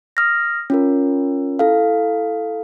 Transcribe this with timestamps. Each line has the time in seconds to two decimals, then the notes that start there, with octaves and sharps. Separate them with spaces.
0.17 D#6 F6 A#6
0.70 C#4 F4 A#4
1.59 E4 A4 F5